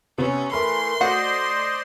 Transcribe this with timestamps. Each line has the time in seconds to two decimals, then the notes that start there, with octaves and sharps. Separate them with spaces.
0.18 C3 B3 C#4
0.52 E3 A3 A#4 B5 C6
1.01 A3 F#4 C5 D5 D#5